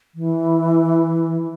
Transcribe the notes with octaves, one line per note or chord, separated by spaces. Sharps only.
E3